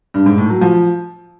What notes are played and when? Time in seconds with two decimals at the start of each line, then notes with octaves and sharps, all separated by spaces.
0.14 G2
0.26 G#2
0.38 A2
0.50 F#3
0.61 F3